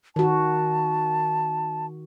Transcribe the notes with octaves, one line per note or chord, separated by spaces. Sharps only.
D#3 F#4 A5